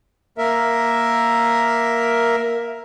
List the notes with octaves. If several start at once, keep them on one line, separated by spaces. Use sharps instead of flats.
A#3 A#4 E5